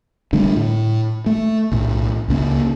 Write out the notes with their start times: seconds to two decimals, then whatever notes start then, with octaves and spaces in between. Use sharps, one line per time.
0.33 D3 G3 A3 D4
0.56 A2
1.26 A3
1.72 B1 A2
2.28 C#2 C#3 A#3